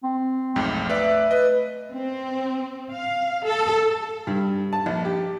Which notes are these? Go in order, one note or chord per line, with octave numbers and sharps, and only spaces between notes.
C4
B1 F2 G#2 A3
B4 D5 E5
B4 D#5
C4
F5
A4
G2
A5
A#1
G4